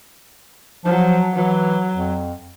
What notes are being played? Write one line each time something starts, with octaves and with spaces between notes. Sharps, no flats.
F3 F#3
E3 F#3
F2